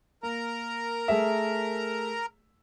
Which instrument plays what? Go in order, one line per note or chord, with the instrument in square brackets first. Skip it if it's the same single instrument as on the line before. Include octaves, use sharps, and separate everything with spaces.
[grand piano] A#3 [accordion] A#4 A#5
[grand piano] A3 G#4 E5